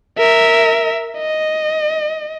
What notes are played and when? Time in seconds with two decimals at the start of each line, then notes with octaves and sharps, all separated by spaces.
0.18 A#4 E5
1.18 D#5